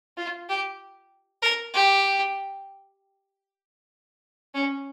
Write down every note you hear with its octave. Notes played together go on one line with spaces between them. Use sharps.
F4
G4
A#4
G4
C#4